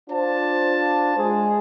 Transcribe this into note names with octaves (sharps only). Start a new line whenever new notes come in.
D4 F4 C5 A5
G#3 G#4